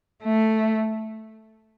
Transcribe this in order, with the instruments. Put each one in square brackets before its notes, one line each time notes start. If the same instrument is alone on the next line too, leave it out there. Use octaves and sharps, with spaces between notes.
[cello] A3